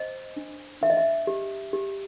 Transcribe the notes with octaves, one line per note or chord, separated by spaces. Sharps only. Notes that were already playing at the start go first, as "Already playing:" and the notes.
Already playing: C5 D#5
D4
D4 E5
D#5
E5
G4
G4